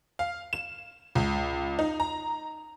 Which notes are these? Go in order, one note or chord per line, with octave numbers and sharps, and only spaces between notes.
F5
E7
C#2
D#4
A#5